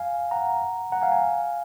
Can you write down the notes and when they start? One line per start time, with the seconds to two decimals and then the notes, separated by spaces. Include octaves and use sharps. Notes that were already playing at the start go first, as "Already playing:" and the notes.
Already playing: F5 G#5
0.31 F#5 A#5
0.92 F#5 A#5
1.02 F5 G#5
1.12 F5 G#5